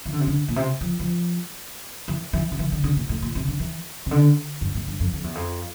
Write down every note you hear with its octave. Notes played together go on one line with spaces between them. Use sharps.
E3
D3
C3
D3
A#2
C3
F3
F3
E3
E3
D3
E3
D3
D3
A#2
A2
A#2
C3
D3
E3
C3
D3
G2
A2
G2
F2
F2
E2
F2